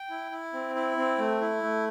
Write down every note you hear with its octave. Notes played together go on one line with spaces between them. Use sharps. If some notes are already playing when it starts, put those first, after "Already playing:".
Already playing: G5
E4
E4
C4
E4
C4
A3
E4
A3